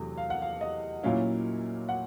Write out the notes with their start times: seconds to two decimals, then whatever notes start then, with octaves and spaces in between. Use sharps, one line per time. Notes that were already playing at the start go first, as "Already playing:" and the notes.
Already playing: E2 C3 F#3 A3
0.17 F5
0.30 F#5
0.42 F5
0.61 D#5
1.03 A#2 F#3 A#3 C#4 E4 F5
1.89 F#5